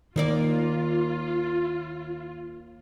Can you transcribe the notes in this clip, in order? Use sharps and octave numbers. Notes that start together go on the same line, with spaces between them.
D#2 D#3 A#3 F4 D5